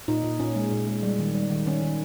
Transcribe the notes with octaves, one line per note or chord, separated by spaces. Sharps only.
A#2 D#4
A#2
A#2 C#4
G#3
A#2
G#3
G3
D#3
G3
D#3
D#3 C#4
D#3